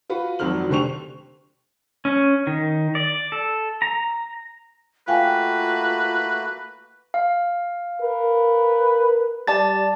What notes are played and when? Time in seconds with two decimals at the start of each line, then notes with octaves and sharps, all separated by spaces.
0.10 F4 F#4 B4
0.39 G#1 F2 F#3 C4 F6 F#7
0.69 F1 D3 G4 C5 C#6 F7
2.05 C#4
2.47 D#3
2.95 D5
3.32 A4
3.82 A#5
5.08 A3 A#3 F4 F#4 B4 F5 G5 G#5
7.14 F5
8.02 A#4 B4
9.47 G3 D5 A5 A6